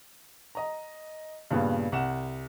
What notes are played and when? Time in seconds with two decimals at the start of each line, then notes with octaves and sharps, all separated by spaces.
0.55 D#5 A#5
1.51 G2 A#2 C#3 B3
1.92 C2 F#5 E7